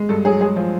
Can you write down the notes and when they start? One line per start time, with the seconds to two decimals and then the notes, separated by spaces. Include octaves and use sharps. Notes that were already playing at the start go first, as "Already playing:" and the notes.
Already playing: G#3
0.09 G2 A4
0.25 F#3 G#4
0.41 G#3 G#4
0.56 F3